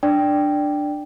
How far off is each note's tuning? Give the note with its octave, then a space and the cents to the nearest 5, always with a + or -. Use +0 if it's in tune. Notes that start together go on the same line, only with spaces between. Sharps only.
D4 +10 D5 +0 G5 +0